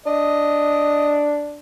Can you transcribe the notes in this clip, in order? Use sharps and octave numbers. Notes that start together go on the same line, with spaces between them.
D4 D#5